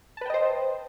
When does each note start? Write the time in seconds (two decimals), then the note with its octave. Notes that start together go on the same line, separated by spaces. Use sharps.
0.17 A5
0.21 B4
0.26 G5
0.30 D#5
0.34 C5